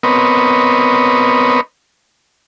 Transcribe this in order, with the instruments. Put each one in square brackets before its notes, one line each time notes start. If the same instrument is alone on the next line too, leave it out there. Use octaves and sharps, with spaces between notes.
[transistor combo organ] B3 C4 A#4 B4 C#5 D#5